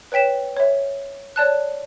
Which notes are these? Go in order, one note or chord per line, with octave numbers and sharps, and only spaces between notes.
B4 C#5 G5 B6 E7
C#5 E5
C#5 D5 A5 F#6